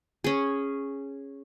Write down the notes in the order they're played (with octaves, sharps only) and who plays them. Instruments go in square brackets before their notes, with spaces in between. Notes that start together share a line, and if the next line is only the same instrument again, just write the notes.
[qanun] C#4 G#4